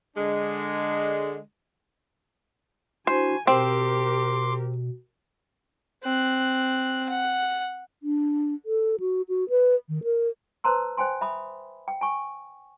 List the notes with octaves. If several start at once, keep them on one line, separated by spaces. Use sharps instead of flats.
D3 G#3 D4
D4 E4 F#4 C5 G#5
B2 C4 G4 A#4 C6 D6
C4 F#6
F#5
D4
A4
F#4
F#4
B4
D#3
A#4
B4 C5 A5 A#5 C6 E6
C5 G5 G#5 C6
E5 B5 D#6
G5
G#5 C#6